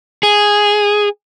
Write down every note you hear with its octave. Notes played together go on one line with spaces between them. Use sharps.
G#4